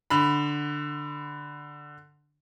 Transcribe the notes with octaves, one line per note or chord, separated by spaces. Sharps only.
D3 B5